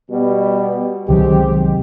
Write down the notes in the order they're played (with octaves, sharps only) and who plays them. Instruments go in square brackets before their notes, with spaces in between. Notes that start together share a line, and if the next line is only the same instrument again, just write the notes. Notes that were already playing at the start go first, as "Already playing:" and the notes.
[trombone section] B2 G3 B3
[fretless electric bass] C2 D#3 F#3 [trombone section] G#3 C4 G4